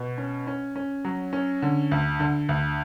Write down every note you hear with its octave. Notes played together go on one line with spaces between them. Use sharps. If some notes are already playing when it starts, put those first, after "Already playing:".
Already playing: B2
C#4
C#4
C#4
F#3
C#4
D3
D2
D3
D2